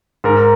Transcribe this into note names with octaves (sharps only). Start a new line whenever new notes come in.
G#2 A#4